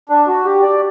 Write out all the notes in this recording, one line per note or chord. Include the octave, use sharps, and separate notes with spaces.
D4
F#4
G4
D5